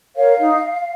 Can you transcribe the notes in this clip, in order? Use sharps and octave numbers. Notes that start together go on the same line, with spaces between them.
A#4 C#5 F5
D#4